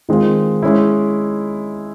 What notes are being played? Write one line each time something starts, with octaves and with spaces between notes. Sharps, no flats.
D#3 G#3 C4 F4
G#3 C#4 E4